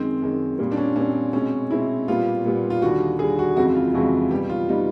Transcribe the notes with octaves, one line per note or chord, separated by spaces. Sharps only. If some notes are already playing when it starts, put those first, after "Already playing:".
Already playing: F#2 D#3 G#3 C4
F#2 D#3 G#3
A#2 G3 C4
D4
C#4
A#2 G3 C4 C#4
B2 G#3 C4 C#4
B2 G#3 C4 E4
A#2 G3 B3 F4
A#2 G3 B3
F4
D#2 D3 G3 F#4
D#2 D3 G3 G#4
F#4
F2 C#3 E3 G#3 C4 F#4
F4
F2 C#3 E3 G#3 C4 F#4
B2 G3 B3 G4
F4
B2 G3 B3 D#4